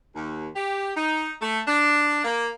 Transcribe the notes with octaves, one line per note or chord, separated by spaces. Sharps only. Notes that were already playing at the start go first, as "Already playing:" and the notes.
D#2
G4
D#4
A3
D4
A#3